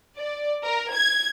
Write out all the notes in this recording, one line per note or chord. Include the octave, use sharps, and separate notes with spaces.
D5
A#4
G#6